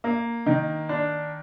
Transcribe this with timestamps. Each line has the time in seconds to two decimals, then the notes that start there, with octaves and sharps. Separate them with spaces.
0.04 A#3
0.46 D#3
0.89 D4